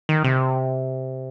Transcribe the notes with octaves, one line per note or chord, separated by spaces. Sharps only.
D#3
C3